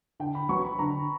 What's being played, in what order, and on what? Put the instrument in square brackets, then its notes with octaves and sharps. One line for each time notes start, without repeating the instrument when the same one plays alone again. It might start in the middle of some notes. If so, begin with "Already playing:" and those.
[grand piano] D3 [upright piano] G5
[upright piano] B5
[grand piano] F#3 B3 [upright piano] C#6
[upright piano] B5
[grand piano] D3 [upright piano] A#5